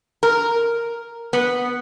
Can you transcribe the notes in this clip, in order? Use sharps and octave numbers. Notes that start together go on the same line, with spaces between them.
A#4
B3